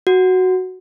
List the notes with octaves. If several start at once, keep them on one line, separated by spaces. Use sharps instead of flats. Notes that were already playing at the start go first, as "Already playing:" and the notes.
F#4